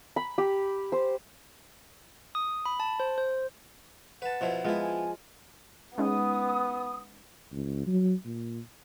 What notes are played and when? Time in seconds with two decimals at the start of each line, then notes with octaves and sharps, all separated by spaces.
0.16 B5
0.38 G4
0.92 C5
2.35 D#6
2.66 B5
2.80 A5
3.00 C5
3.18 C5
4.22 B4 F#5 A5
4.41 B2 F3 E4
4.65 F3 G#3 B3 E4
4.80 G#5
5.98 G#3 B3 C#4 D#4 D#6
7.52 C#2
7.87 F#3
8.26 A#2